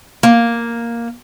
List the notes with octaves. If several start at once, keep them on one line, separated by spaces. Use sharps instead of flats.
A#3